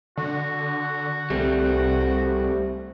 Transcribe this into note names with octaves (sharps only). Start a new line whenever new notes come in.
D3 F#4
C2 G3 A3 C4